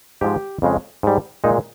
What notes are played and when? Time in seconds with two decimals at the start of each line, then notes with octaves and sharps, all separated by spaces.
0.21 G#2 F3 G#3 G4
0.62 F2 C#3 G#3
1.03 G#2 G3
1.44 A#2 G#3 D#4